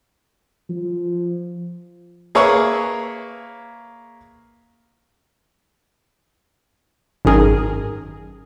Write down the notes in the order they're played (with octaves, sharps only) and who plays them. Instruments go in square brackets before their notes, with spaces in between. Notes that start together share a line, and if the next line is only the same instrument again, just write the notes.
[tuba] F3
[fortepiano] A#3 G#4 B4 C#5 E5
[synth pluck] G#1 F#2 D#3 G#4 A#4